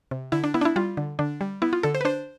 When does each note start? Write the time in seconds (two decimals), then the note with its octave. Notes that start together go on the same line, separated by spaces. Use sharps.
0.11 C3
0.32 D3 E4
0.44 D4
0.54 B3 E4
0.61 D4
0.65 E4
0.76 G3 F4
0.97 D3
1.19 D3 D4
1.41 G3
1.62 B3 E4
1.73 F4
1.83 D3 A4
1.95 C5
2.01 B4
2.05 D4 C5